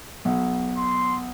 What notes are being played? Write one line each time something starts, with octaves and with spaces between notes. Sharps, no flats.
B1
C6